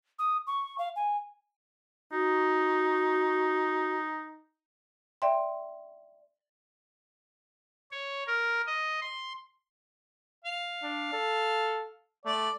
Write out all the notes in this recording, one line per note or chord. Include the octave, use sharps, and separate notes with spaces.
D#6
C#6
F5
G#5
D#4 F#4
D5 E5 G5 C6
C#5
A#4
D#5
C6
F5
D4
A4
A3 D5